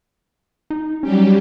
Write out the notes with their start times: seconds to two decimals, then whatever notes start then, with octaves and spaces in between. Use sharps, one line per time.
0.70 D#4
1.03 F#3 G3 C#4 G4